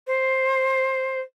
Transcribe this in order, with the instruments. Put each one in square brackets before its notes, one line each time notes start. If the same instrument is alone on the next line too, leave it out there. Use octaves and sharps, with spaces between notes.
[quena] C5